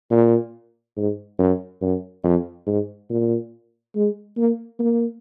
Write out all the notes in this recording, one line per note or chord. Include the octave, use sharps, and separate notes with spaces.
A#2
G#2
F#2
F#2
F2
G#2
A#2
G#3
A#3
A#3